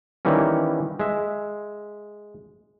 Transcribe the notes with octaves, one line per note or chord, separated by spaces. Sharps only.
D#3 E3 G3 A#3 C#4
G#3 E5